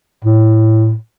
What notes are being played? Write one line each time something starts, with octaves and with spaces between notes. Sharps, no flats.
A2